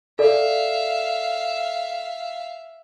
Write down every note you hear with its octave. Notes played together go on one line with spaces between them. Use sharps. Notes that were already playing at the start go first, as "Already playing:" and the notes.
A4 D5 E5 F5